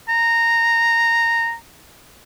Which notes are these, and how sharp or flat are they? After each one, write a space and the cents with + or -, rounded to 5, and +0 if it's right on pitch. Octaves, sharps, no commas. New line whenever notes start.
A#5 -10